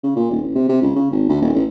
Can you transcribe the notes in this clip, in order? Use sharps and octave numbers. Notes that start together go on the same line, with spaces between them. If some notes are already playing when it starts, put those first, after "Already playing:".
C#3
A#2
D#1
A1
C3
C3
C#2
C#3
G#1
D2
D#1
A1